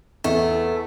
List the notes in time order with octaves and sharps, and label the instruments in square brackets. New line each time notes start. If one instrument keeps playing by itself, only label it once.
[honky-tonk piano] E2 [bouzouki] A3